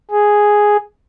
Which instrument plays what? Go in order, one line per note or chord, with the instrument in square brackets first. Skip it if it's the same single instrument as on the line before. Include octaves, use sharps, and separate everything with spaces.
[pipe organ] G#4